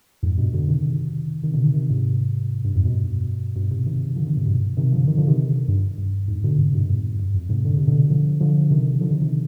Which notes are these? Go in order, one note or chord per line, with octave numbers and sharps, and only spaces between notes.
F2 G#2
G2 B2
B2 D3
C3 D#3
C3 D#3
B2 D3
C3 D#3
C3 D#3
G#2 C3
G2
F2 G#2
G2 B2
G2 B2
G#2 C3
C3 D#3
D3 F3
C3 D#3
G#2 C3
G2 B2
C3 D#3
D3 F3
C3 D#3
D3 F3
C3 D#3
G2
G2
F2 G#2
B2 D3
G#2 C3
G2 B2
F2 G#2
G2
F2
G#2 C3
D3
C3
B2 D3
D3 F3
D3 F3
C3 D#3
D3 F3
C3 D#3
C3 D#3